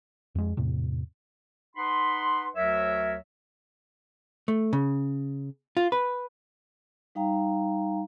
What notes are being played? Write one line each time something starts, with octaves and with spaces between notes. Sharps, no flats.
F2 G#3
E2 A2 C3
D#4 B4 F#5 B5 C6
D2 F#3 A#4 C#5 E5
A3
C#3
F4
B4
G3 D#4 F5 G5 A#5